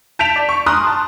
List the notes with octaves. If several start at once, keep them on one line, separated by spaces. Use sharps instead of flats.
A5 G6 B6 D7 E7 F7
D5
C#6
G#5 A#5 C6 D#6 F6 F#6
A5